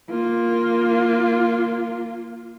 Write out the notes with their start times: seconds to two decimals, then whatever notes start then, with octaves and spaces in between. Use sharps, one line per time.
0.10 A#3 F4